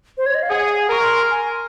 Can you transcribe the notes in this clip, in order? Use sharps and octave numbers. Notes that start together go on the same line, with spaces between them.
C5
C#5
D#5
F5
G#4 F#5
G#5
A#4 C#6
C6
G#5